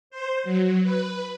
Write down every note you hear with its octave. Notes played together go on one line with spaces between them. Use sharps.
C5
F#3
B4